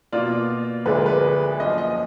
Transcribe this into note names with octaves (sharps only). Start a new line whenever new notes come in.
B2 A#3 F4 D5
D2 D3 F3 G#3 D4 B4
A#4
B4
F#2 F3 A#3 D4 D#5
D#5